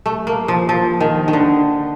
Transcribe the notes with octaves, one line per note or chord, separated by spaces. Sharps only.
A3
A#3
F3
F3
D#3
D#3
D3